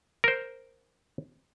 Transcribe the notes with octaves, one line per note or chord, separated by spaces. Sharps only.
A#4 C5